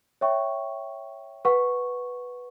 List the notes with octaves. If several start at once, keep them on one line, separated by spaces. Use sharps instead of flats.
C#5 E5 G5 C#6
B4 F#5 C#6